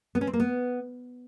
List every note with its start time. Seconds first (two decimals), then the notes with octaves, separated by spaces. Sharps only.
0.15 B3
0.21 C#4
0.27 C4
0.33 A#3
0.40 B3